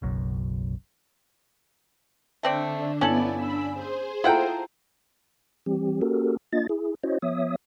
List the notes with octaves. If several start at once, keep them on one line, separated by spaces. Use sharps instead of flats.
F#1 B1 F#2
D3 A3 C4 D4 D5
G1 B3 C#4 E4 A4 D5 G#5 F#7
D4 B5 E6
G#4 C5
E4 F4 A4 F#5 G5 A#5
E3 G3 C4 G4
A#3 C#4 F#4 G4 A4 A#4
A#3 D4 F4 D#5 A6
E4 G#4
C#4 E4 F#4 C5 C#5 D#5
F3 B3 C#5 E5 D#6